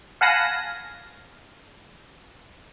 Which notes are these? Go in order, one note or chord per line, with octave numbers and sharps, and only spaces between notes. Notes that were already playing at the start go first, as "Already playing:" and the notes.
F5 F#5 G#5 A5 B5 A#6